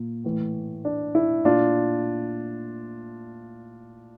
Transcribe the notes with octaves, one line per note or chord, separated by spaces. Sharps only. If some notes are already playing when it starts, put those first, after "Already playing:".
Already playing: A#2
A2 E3
D4
E4
A#2 D4 F4